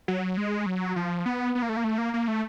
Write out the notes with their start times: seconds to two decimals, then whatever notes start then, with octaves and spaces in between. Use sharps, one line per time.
0.08 F#3
0.37 G#3
0.66 F#3
0.96 F3
1.26 B3
1.55 B3
1.62 A#3
1.69 A3
1.77 A#3
1.84 A3
1.98 A#3
2.14 A#3
2.28 A3